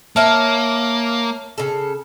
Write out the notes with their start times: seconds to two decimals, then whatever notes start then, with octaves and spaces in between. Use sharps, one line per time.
0.16 A#3 C#5 E5 A5 F6
1.58 C#3 A4